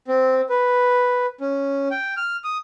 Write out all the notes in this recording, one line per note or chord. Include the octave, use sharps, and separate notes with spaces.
C4
B4
C#4
G5
F6
D#6